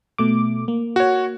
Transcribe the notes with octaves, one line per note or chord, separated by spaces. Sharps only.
B2 A3 D6
A#3
F#4 C#5